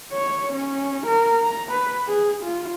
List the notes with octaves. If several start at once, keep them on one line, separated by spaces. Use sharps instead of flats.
C#5
C#4
A#4
A#5
B4
G#4
F4